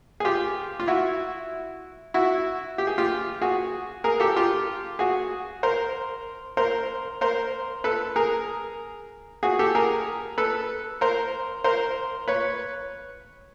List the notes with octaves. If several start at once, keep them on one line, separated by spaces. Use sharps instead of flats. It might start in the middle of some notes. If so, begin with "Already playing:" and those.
G#4
F4 G4
F4
E4 F#4
E4 F#4
G4
G#4
F4 G4
F#4 G#4
G#4 A#4
G4 A4
F4 G4
F#4 G#4
A#4 C5
A#4 C5
A#4 C5
A4 B4
G#4 A#4
F#4 G#4
G4 A4
G#4 A#4
A4 B4
A#4 C5
A#4 C5
B4 C#5